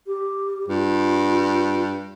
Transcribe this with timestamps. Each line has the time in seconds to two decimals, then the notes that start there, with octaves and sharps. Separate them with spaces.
0.07 G4
0.68 G2 F4